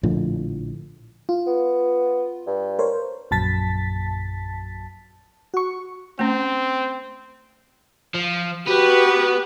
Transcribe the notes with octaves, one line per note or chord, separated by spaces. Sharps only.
A#1 A2 D3 F3
F4
B3
G2
A#4 C5 C#5
A#1 F#2 A5 A6 B6
F#4 C#6
A3 C4 C#4
F3
B3 F#4 G4 B4